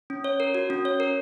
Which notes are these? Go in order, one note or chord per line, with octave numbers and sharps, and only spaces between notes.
C#4
C#5
A#4
F#4
C#4
C#5
A#4